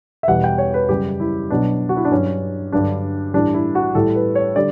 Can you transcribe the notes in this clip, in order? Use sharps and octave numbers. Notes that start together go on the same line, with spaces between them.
E5
E2 B2 G3 F#5
G5
C#5
B4
F#2 C#3 G3 G4
E4
B2 F#3 D4
F#4
E4
D4
G2 F#3 C#4
G2 D3 F#3 D4
A2 E3 G3 D4
E4
F#4
A2 E3 G3 A4
B4
C#5
D3 G3 D5